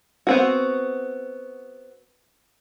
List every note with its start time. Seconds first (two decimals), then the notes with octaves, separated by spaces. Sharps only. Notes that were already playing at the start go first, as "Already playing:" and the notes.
0.27 B3 C4 F#4